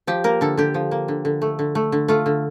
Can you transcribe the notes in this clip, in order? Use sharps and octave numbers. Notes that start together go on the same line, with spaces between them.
F3 G4
A#3 A#4
D3 A4
D3 G4
F3
A#3
D3
D3
A3
D3
A3
D3
A3 F4
D3